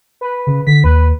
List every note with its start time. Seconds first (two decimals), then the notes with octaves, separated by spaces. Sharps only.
0.21 B4
0.47 C#3
0.67 D3 B6
0.84 D#2 B4